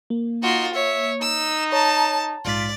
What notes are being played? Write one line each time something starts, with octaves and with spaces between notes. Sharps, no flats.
A#3
D#4 F4 F#4
C#5 E5
D#4 E6
C#5 A5 A#5
A#1 G#2 F4 D5 B6